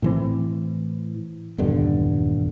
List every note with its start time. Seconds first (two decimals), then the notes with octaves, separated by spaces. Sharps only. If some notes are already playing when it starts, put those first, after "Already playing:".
0.02 A2 E3 C4
1.58 D#1 E2 G2 D3